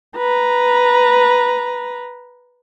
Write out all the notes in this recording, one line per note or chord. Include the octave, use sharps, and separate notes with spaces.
B4 A#5